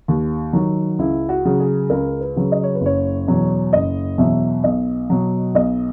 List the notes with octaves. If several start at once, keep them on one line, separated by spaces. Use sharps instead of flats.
D#2
D#3 F#3
C#2 E4
F#4
C#3 F#3
G#4
C#2 A#4
B4
C#3 F#3
D#5
C#5
B4
F#1 C#5
E2 B2 F#3
F#1 D#5
E2 B2 F#3 E5
B1 D#5
B2 F#3
B1 D#5